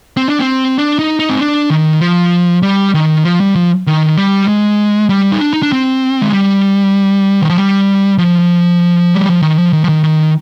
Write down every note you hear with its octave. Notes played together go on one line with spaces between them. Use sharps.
C4
D4
C4
D4
D#4
D#4
C4
D4
D#3
F3
G3
D#3
F3
G3
F3
D#3
G3
G#3
G3
D#4
D4
D#4
D4
C4
G#3
G3
D#3
F3
G3
F3
G3
F3
D#3
F3
D#3
F3
D#3
D#3